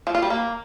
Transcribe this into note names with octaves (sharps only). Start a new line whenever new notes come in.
F3
F4
G3
A#3